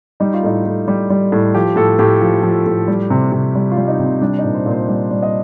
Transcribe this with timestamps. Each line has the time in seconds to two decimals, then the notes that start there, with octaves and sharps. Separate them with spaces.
0.20 G3 D#4
0.34 F4
0.43 A2 D#4
0.66 A2
0.88 G3
1.10 G3
1.32 A2
1.55 F3 G4
1.76 A2 A4
1.99 A2 G4
2.21 F3
2.43 F3
2.66 A2
2.88 G3
3.10 C3
3.32 C3
3.55 G3
3.71 F4
3.77 G3
3.88 D#4
3.99 C3
4.04 C4
4.21 G3 D4
4.39 D#4
4.44 A#2
4.54 C5
4.66 A#2
4.71 C5
4.89 G3 D5
5.11 G3
5.22 D#5